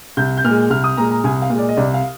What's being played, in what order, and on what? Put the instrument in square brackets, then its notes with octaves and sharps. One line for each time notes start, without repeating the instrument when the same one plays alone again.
[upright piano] C2 G6
G6
A#2 F6
G#3
C2 F6
D#6
A#2 G#3 A#5
A#5
C2 G#5
F5
A#2 G#3
D5
D#5
C2 D5
F5